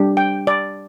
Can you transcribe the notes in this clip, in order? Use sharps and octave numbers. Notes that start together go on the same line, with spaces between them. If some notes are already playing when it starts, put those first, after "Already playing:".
Already playing: G3 D4 G4
G5
D5